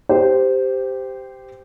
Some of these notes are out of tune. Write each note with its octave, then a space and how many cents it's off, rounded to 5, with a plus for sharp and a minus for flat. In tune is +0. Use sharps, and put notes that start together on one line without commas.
G4 +0 C5 -15